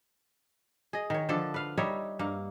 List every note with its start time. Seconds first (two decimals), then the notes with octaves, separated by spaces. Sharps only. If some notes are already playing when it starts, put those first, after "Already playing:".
0.93 G#4 D#5
1.10 D#3 C#5
1.29 D3 F3 D4 A4
1.54 B4 F5
1.77 G3 D#4 C#5 E5
2.19 G2 A#3